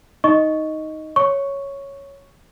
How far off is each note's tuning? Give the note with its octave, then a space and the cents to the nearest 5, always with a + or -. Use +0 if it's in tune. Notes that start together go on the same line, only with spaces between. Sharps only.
D#4 +10 D#5 +0 C#6 +0
C#5 +0 C#6 +0